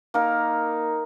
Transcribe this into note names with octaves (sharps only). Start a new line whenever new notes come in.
A#3 D#4 A#4